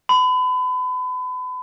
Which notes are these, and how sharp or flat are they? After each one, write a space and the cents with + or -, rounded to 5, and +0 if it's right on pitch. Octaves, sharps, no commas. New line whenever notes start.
B5 +35